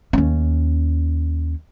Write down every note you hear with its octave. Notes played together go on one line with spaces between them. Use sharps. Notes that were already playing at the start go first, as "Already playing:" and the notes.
D#2 C#4